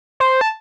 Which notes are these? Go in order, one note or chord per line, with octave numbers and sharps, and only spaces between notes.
C5
A5